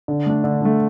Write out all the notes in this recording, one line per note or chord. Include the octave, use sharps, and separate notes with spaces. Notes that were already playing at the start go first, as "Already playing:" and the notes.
D3
A3 D4
D3
A3 D4